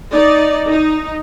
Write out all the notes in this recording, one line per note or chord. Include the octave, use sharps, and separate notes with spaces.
D#4 D5
D#4